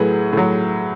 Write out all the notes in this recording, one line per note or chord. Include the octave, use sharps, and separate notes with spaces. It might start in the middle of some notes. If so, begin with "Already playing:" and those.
Already playing: A2 F#3 G#4 B4
A2 F#3